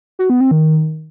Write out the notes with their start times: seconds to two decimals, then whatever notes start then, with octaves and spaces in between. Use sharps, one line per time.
0.19 F#4
0.30 B3
0.40 C4
0.51 D#3